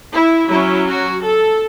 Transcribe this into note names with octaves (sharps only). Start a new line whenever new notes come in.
E4
F#3 C#4 E4
F#4
A4